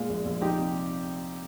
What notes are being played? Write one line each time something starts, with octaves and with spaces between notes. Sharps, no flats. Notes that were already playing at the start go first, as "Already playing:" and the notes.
Already playing: A#2 G#3 F4
A#1
A#1
F3 D#4 G4
C3